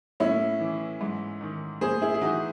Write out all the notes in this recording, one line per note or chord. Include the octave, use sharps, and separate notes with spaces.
A2 C#4 E4
E3
G#2
D#3
A2 G#4 C5
E4 G#4
G#4
E3 D#4 F#4